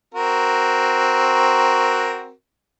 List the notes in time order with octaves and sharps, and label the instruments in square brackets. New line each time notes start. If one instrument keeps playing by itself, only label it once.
[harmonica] C4 F#4 A#4